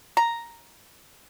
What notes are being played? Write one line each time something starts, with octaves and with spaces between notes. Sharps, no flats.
A#5